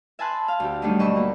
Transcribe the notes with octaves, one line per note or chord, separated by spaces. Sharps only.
E5 G#5 A5 B5 C6 F#6
F5
D2 G4
D#3 F#3 G3 A3 D4 D#4
D2 B2 D#5 B5 C#6 E6
A#3